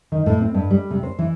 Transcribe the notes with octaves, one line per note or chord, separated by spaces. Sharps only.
D#3
A2
C4
G2
G3
C3
C5
E3